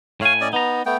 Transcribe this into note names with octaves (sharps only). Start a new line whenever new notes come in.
A2 C#5 F5 G#5
C#4 D5 D#5
B3 D#4 A#5
A3 B3 G5